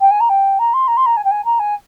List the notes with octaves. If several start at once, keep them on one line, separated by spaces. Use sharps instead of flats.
G5
G#5
A#5
G5
A#5
C6
A#5
C6
A#5
G#5
G5
G#5
A#5
G#5